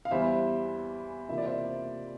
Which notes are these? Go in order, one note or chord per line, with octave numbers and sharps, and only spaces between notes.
F5
E2 E3 G3 C5 E5
C3 E3 A#3 F4 E5
D5
C5 E5